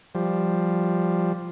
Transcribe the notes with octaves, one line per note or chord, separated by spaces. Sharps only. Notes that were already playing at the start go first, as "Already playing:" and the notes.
F3 G3